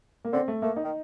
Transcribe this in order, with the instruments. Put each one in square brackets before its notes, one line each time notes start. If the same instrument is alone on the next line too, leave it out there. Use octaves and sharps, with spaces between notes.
[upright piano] A#3
[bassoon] D3 [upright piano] C4
[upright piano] A3
[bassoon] A3 [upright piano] A#3
[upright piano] D#4
[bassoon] D#3